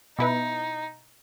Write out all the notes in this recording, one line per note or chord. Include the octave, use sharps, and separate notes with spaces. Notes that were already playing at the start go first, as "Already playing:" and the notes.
B2 D#4 E4 B4